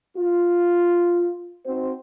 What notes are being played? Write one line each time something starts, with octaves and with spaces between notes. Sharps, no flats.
F4
C4 D#4 F#4 C5